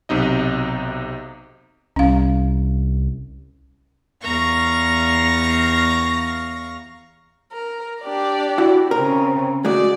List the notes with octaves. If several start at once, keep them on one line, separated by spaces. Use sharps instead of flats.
B1 C3 D#4 D#5
C2 C#4 F5
E2 F5 A#5 C#6 A#6
A#4
D4 G4 D5
E4 F#4
C#3 C4 A#4
G#3 A3 F#4 D5